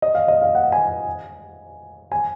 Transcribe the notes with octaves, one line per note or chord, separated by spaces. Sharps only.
D#5
F5
D#5
F5
F#5
G#5
G#5